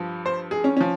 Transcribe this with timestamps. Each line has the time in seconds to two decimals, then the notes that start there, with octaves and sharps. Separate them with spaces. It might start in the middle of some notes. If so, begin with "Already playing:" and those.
Already playing: G2 F3
0.26 C5
0.51 G#4
0.64 C#4
0.77 F3 C#4